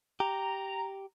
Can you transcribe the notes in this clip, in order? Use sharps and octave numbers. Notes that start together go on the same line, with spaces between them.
G4 A#5